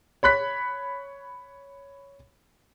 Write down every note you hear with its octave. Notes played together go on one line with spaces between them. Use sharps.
C#5 B5 F#6 B6